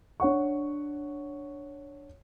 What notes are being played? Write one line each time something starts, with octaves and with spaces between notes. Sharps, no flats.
D4 C#5 F#5 C#6